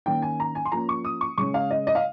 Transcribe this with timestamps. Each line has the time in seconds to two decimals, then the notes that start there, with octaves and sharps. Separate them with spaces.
0.06 D#3 A#3 C#4 G5
0.22 G#5
0.40 A#5
0.55 G#5
0.65 C6
0.72 F3 A#3 C#4 A#5
0.89 C#6
1.05 D#6
1.21 C#6
1.38 C#3 G#3 C#4 C#6
1.54 F5
1.71 D#5
1.87 D#5
1.95 F5